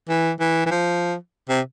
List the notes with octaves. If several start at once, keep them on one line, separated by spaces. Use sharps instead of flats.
E3
E3
E3
F3
C3